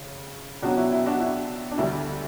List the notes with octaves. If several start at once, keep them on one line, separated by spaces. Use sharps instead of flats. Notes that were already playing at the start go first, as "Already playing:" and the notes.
Already playing: C#3
C#2 B2 F#3 D4 F#4
E4
E4
D4 F#4
E4
D4
D2 D3 G3 E4